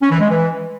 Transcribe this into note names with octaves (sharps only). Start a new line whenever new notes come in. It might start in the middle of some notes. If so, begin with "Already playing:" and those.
C#4
E3
G#3
E3